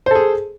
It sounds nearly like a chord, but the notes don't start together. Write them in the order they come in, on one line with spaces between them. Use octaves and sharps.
C5 A4 G#4